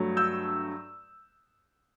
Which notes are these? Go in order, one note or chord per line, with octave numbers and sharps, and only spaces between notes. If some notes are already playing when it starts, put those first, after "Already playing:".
Already playing: G2 F#3 A3
E6 G6